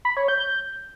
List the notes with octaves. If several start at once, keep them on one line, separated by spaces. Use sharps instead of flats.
B5
C#5
G6
G6